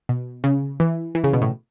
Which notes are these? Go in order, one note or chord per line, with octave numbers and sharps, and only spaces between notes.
B2
C#3
E3
E3
C#3
B2
A2